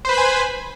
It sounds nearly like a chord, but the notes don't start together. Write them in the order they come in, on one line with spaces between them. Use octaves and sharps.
C5 B4 B5 G#5